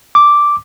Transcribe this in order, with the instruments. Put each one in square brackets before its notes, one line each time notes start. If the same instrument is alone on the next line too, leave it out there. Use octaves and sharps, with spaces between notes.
[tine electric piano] D6